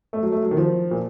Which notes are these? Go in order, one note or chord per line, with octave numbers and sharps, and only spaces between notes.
A3
F#3
A3
F#3
D#3
F3
A#2